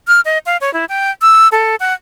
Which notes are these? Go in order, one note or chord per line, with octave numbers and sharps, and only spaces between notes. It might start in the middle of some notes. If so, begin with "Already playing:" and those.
F6
D#5
F5
C#5
E4
G5
E6
A4
F#5